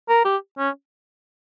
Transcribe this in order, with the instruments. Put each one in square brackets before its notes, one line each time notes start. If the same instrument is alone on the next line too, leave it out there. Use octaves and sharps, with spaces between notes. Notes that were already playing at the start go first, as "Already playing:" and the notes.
[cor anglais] A#4
G4
C#4